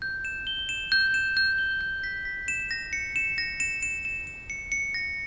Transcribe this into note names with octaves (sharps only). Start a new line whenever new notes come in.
G6
E7
G7
E7
G6
E7
G6
G7
G6
B6
B6
E7
A#6
C#7
E7
A#6
E7
E7
E7
E7
C#7
C#7
A#6